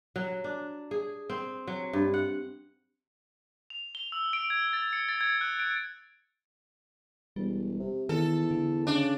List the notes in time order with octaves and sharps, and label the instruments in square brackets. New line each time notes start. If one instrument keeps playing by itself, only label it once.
[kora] F#3
D4
G#4
C4
F#3
G2
F#5
[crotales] F7
G7
E6
D7
G#6
A6
C#7
A6
G#6
F#6
D7
[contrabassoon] E1 [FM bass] G3
[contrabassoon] C3
[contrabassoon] E2 [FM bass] D#3 [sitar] A4
[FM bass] D3
[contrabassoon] C#3 [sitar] D4